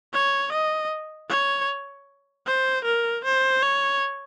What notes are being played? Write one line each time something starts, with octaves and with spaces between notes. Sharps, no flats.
C#5
D#5
C#5
C5
A#4
C5
C#5